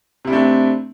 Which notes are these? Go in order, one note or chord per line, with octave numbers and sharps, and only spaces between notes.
C3 A3 C4 D4 E4